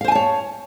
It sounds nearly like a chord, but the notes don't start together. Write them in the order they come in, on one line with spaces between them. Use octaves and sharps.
F5 C5 G#5 A5 C#5